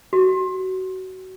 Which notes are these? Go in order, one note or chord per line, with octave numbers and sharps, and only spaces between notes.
F#4